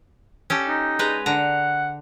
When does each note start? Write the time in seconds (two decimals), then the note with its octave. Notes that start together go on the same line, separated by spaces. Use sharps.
0.50 C#4 G4 A4
0.68 D#4
0.99 G#3 B4 A#5
1.26 D3 F#5 A#5